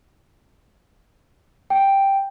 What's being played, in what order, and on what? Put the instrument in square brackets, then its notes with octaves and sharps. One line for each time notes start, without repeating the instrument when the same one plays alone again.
[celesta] G5